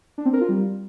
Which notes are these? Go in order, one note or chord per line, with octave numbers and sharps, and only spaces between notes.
D4
C4
A#4
F4
G3